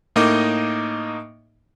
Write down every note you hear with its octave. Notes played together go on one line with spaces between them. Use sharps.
A2 A#3 D#4 D#5 D6